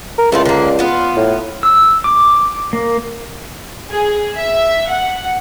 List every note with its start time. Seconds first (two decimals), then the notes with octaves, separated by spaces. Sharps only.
0.18 A#4
0.32 C#2 A3 E4 F4
0.45 D3 A#3
0.79 B3 F4
1.17 A2
1.63 E6
2.04 D6
2.73 A#3
3.91 G#4
4.38 E5
4.91 F#5